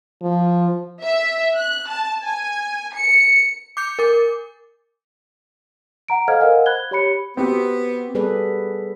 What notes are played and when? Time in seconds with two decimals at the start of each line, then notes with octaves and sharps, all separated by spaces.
0.23 F3
1.03 E5
1.55 F#6
1.88 A5
2.22 G#5
2.94 C#7
3.77 D6 G6 C#7
3.99 A#4 D6
6.08 F#5 A#5 D7
6.28 A4 C5 D#5 F5 F6 G#6
6.40 A#4 C5 D#5 F5 F#5 G#5
6.66 B5 F#6 G#6 G7
6.91 G4 C#5 B5 C#7
7.37 B3 C4 F#4 G4
8.15 G3 B3 G#4 A4 B4 D5